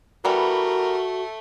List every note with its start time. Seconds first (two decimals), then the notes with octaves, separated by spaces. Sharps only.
0.25 E3 G3 A3 B3 F#4 A#4